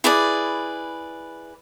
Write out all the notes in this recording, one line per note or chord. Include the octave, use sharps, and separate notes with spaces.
E4 G#4 B4 D5